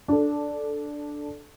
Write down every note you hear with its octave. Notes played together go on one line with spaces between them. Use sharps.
D4 A4